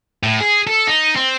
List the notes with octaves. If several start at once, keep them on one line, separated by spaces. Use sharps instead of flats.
A2
G#4
A4
D#4
C4